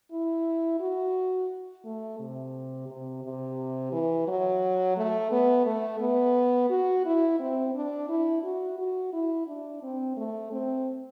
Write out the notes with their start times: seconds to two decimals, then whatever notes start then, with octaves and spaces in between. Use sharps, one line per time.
0.12 E4
0.80 F#4
1.85 A3
2.19 C3
2.88 C3
3.24 C3
3.92 E3
4.28 F#3
4.97 A3
5.31 B3
5.66 A3
6.00 B3
6.70 F#4
7.05 E4
7.40 C4
7.75 D4
8.09 E4
8.43 F#4
8.79 F#4
9.13 E4
9.47 D4
9.83 C4
10.17 A3
10.52 C4